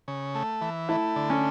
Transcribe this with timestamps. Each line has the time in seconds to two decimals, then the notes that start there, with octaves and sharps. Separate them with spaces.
0.08 C#3
0.35 A3
0.61 E3
0.89 A3 E4
1.16 D3
1.30 C#4